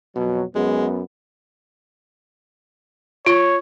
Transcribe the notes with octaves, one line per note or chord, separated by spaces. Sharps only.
F2 B2 F#3
F#2 G#3 B3
F4 C#5